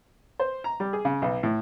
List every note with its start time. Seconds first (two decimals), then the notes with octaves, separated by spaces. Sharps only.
0.39 C5
0.64 A#5
0.80 G3
0.93 G#4
1.05 C#3
1.22 B1
1.43 A2